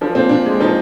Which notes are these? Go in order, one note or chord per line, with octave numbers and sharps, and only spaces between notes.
F3 D4
A#2 C4
A#2 D4
G#3
F3 D#4